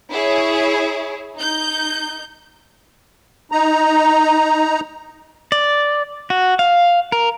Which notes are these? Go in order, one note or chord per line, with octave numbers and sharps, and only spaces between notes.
E4 G#4 C#5
D#4 G6
D#4 A#5
D5
F#4
F5
A#4